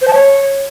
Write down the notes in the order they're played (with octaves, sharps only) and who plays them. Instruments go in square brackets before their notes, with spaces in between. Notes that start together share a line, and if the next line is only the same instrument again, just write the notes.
[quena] C5
A5
C#5